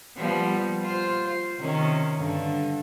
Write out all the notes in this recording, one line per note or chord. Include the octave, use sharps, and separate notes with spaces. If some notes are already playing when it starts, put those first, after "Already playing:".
F3 G3 B3
F4 C5
C3 D#3 C#4
G2 D3